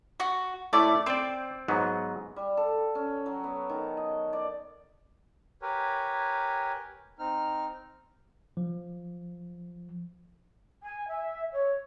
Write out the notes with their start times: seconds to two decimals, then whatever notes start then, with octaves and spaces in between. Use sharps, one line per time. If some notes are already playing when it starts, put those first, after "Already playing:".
0.20 F#4
0.73 A2 A3 E4 D5
1.06 C4 C5 D5
1.68 G#2 F#3 B3
2.36 G3
2.57 A4
2.95 C#4
3.26 F#3
3.44 B3
3.69 D#3
3.97 D#5
4.33 D5
5.62 G4 A#4 B4 C#5 G#5
7.19 C4 D#4 F6
8.57 F3
10.83 G#5
11.08 E5
11.53 C#5